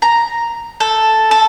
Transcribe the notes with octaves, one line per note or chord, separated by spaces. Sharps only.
A#5
A4
A4